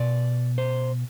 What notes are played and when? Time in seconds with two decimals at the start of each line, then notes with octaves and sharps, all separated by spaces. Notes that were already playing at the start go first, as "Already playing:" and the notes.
Already playing: B2 D5
0.58 C5